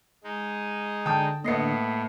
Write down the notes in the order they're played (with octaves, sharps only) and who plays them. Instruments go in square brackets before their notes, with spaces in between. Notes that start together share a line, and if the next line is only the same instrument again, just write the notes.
[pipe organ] G#3 D#4
[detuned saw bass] D3 [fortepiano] G5 A5 D#6
[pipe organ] A2 [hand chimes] A#3 C7 C#7 [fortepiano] B3 D#5